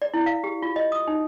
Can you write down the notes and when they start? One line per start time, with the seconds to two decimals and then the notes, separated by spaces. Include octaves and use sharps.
0.02 D5
0.14 E4
0.26 F5
0.44 G4
0.62 F4
0.76 D#5
0.92 D#6
1.07 D#4